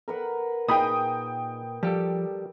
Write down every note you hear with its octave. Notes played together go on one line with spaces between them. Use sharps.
A#4 B4 F#5
A#2 D#4 G#4 D#5 G5 B5 D#6
F3 G3 G4 A4